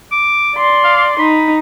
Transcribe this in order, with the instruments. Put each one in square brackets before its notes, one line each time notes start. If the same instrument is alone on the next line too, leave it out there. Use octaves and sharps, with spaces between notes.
[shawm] D6
[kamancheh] D5 C6
[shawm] F5
[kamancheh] D#4 [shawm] B5